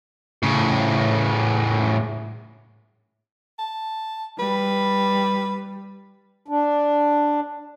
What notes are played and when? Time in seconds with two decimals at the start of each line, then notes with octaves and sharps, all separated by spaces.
0.43 A2 C#3
3.59 A5
4.39 G3 B4
6.48 D4